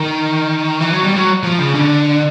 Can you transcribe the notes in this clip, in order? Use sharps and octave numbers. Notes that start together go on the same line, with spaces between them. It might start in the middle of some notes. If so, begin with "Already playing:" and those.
Already playing: D#3
E3
F#3
G3
F#3
F3
C#3
D3